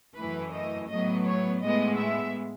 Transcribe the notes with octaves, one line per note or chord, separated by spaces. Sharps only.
F#2 E3 A3 B4
D#5
A2 F#3 B3 D#5
C#5
A2 G#3 B3 D#5
E5